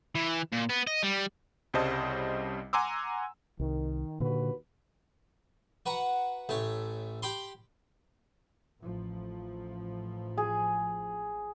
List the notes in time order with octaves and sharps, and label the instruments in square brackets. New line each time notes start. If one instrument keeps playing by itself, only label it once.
[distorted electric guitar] E3
A#2
B3
D#5
G3
[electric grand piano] C2 C#3 G3 C5 D#5 A5
F#5 G#5 A#5 C6 D6 E6
[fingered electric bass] C2 [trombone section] D#3
[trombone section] D#2 F#4 B4 [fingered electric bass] A#2 D3
[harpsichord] F#4 B4 F#5 A#5
A1 A3 C#5
G4 G5 B5 C6
[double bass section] A1 F3
[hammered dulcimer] G#4